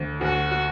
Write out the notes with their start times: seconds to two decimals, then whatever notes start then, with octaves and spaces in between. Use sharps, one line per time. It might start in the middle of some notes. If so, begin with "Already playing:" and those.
Already playing: D2
0.21 D2 F#4